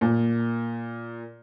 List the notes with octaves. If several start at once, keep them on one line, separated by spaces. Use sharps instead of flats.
A#2